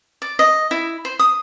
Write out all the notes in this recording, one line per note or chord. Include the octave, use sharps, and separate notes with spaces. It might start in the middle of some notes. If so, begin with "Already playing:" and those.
D5
D#5
E4
C5
D#6